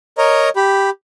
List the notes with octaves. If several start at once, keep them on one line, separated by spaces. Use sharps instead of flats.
A#4 C#5 D#5 A#5
G4 B5